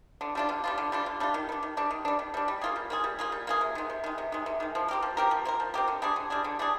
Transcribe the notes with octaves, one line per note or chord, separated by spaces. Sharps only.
D3
G3 D4 F4
D3
G3 D4 F4
D3
G3 D4 F4
D3
G3 D4 F4
D#3
G3 D4
D#3
G3 D4
D#3
G3 D4
D#3
G3 D4
G3
A#3 F4 G#4
G3
A#3 F4 G#4
G3
A#3 F4 G#4
G3
A#3 F4 G#4
C3
D#3 G#3
C3
D#3 G#3
C3
D#3 G#3
C3
D#3 G#3
F3
C4 G4 A#4
F3
C4 G4 A#4
F3
C4 G4 A#4
F3
C4 G4 A#4
D3
G3 D4 G#4
D3
G3 D4 G#4
D3
G3 D4 G#4